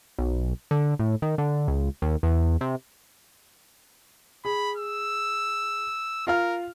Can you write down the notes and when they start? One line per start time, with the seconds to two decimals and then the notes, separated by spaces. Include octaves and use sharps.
0.19 B1
0.71 D3
0.99 A2
1.22 D#3
1.38 D3
1.68 C#2
2.02 D#2
2.23 E2
2.61 C3
4.45 G#4 B5
4.77 E6
6.27 F4 A#4 F5 F6